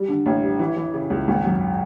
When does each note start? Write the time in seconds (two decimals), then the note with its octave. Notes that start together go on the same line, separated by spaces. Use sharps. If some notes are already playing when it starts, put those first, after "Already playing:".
Already playing: G3
0.09 D3
0.26 A1
0.43 G3
0.59 E3
0.76 E3
0.94 C#3
1.10 C#2
1.28 G#1
1.45 F#2